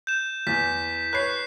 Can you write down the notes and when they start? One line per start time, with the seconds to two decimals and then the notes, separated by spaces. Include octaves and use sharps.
0.07 G6 E7
0.47 E2 B6
1.13 B4 C#5 F#6 C7